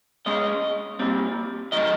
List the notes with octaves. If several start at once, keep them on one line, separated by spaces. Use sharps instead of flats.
B2 G#3 C#4 D#5
A#2 G3 C4
D#3 F#3 A3 D#5